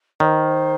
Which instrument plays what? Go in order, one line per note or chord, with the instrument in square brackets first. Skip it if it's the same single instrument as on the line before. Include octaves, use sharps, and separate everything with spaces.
[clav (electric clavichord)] D#3 [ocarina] C5 C#5